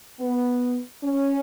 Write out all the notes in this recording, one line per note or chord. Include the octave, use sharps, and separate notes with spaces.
B3
C#4